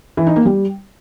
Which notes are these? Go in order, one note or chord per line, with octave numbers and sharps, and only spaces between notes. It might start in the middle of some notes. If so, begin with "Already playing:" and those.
E3
D#4
A#3
G3